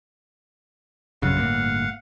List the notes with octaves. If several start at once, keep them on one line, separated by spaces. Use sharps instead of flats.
A#1 F#2 C#3 F5 F#5
G1 A2 A#3